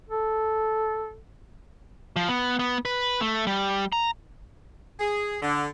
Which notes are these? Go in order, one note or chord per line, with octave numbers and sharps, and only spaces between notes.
A4
F3
B3
B3
B4
A3
G3
A#5
G#4
D3